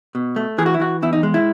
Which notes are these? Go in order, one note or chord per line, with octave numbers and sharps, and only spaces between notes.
B2
A3
E3 G#4
F#4
E4
E3 F#4
E2 E4
D#4
G#3
E4